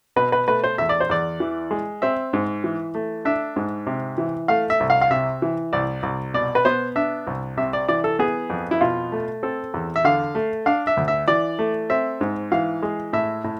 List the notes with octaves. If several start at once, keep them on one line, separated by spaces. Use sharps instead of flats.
B2 B4
B4
A3 B4
C5
E2 E5
D5
C5
E2 D5
E3
G#3
C4 E5
G#2
E3
A3
D4 E5
G#2
C3
E3
A3 F5
E5
C2
F5
F5
C3 E5
E3
C2 D5
C2
B2 D5
B4
B3 C5
D4 E5
C2
C3 E5
D5
E3 D5
A4
B3 G#4
F2
E4
B2 F4
A3
C4 A4
E2
E5
D3 F5
A3
D4 F5
E5
D2
E5
E3 D5
A3
C4 E5
G#2
E3 F5
G#3
A2 E5
A2